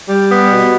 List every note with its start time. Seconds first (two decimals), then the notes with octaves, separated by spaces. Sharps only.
0.09 G3
0.30 B3
0.52 B2